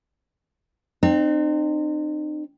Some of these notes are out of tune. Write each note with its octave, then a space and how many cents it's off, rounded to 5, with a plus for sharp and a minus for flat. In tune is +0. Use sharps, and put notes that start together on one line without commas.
C4 +0 D#4 -40